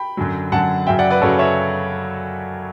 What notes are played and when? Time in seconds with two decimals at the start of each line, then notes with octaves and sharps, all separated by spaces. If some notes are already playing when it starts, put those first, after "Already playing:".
Already playing: G5 B5
0.17 F#2 D3 F#3
0.52 F#2 D3 F#3 F#5 A5
0.87 F#2 C#3 F#3 E5 G5
0.99 D5 F#5
1.10 B4 D5
1.22 F#2 C#3 F#3 A4 C#5
1.39 C#5 E5